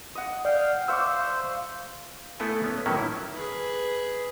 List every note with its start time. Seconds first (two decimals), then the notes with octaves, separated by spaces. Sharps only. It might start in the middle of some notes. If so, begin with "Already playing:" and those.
0.15 D#5 F#5
0.45 D5 F5 G5
0.88 C5 C#5 E5 F5 D6 E6
2.40 A3 B3 E4 A4 B4 G#5
2.64 B3 C#4
2.86 A2 D#3 F#3 A#3 C#4 E5
2.97 E4
3.34 G#4 B4